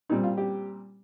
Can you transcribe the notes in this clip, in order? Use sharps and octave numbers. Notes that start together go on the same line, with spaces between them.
A#2 G3 C4 D#4
F4
G4